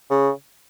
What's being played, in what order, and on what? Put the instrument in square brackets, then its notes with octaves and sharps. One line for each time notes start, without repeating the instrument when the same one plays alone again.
[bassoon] C#3